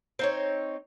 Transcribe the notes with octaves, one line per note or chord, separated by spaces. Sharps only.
C4 D#4 C#5